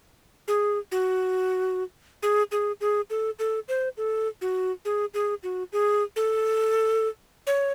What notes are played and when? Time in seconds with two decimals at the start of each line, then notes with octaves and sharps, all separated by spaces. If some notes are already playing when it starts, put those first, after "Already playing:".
0.48 G#4
0.92 F#4
2.23 G#4
2.52 G#4
2.81 G#4
3.10 A4
3.39 A4
3.68 C5
3.97 A4
4.41 F#4
4.85 G#4
5.14 G#4
5.43 F#4
5.73 G#4
6.16 A4
7.47 C#5